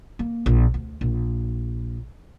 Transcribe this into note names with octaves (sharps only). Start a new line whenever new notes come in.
A#3
A#1
D2
A#1